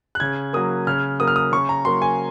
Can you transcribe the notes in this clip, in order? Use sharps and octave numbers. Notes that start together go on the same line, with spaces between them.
F#6
C#3 G#6
F#3 A#3 D#6
C#3 F6
F#3 A#3 D#6
F6
D#6
C#3 C#6
A#5
F#3 A#3 C6
G#5